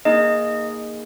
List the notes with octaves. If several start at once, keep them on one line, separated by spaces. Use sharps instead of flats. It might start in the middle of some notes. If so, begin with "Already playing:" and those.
A#3 D#4 G#4 D#5